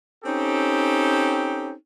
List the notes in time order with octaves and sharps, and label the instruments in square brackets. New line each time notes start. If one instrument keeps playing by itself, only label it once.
[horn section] C4 C#4 D#4 G4 A4